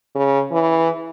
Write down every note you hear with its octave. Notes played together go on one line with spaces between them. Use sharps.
C#3
E3